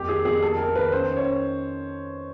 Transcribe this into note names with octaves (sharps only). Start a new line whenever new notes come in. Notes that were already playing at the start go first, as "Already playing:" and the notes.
Already playing: F2 A#3 G4
D#3 G#4
F2 G#4
A#3 A4
D#3 A#4
D#3 B4
C#4 C5
C#4
C#5